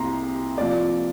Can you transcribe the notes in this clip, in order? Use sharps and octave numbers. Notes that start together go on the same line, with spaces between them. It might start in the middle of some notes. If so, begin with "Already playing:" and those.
Already playing: C2 C3 A#3 A#5 C6
C3 F3 A#3 D5